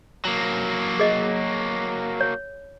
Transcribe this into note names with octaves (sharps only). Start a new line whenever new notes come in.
F#3 A#3
G#4 D#5
C#5